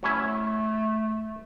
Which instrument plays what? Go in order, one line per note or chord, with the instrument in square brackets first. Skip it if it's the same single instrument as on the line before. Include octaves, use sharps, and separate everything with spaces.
[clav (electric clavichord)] F#3 C#4 E4 [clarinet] A3